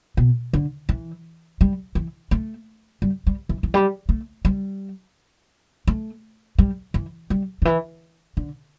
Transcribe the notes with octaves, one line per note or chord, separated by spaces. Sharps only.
B2
D3
E3
G3
E3
A3
G3
G3
E3
E3
G3
A3
G3
A3
G3
E3
G3
D3
E3
D3